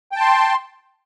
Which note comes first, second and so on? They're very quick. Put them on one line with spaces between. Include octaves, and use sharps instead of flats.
G5 A5 C6